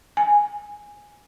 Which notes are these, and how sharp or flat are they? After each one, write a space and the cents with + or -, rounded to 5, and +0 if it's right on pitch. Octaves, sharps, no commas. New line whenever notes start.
G#5 -5